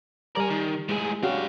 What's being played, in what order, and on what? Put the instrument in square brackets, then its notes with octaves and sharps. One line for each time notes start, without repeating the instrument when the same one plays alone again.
[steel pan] G3 A#4 A#5 [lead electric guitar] D5 G#5
[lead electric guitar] D#3
[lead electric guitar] A2 G#4 [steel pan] G#3
[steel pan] C#4 F#4 G4 [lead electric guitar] D4 F5